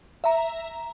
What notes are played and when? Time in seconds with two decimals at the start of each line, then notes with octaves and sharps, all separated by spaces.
0.24 E5 A#5